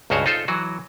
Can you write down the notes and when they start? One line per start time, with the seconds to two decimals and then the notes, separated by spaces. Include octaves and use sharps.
0.10 C#2 G2 C#3 F#4 C5 C#5
0.26 D#4 F4 A4 C5
0.48 E3 F#3 F#4